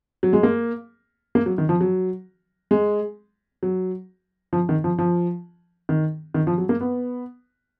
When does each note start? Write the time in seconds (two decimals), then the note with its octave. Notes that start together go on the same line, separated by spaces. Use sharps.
0.23 F#3
0.33 G#3
0.43 A#3
1.35 A#3
1.46 F#3
1.58 D#3
1.69 F3
1.81 F#3
2.71 G#3
3.63 F#3
4.53 F3
4.69 D#3
4.84 F3
4.98 F3
5.89 D#3
6.34 D#3
6.47 F3
6.58 F#3
6.69 A#3
6.81 B3